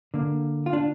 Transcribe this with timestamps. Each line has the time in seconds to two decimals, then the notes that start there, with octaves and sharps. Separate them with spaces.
0.14 D3 A#3
0.66 F4
0.73 D4